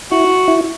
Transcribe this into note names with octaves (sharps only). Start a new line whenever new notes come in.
E4 F#4
E4